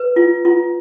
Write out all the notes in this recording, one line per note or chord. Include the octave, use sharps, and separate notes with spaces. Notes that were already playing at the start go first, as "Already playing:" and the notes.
Already playing: B4
F4
F4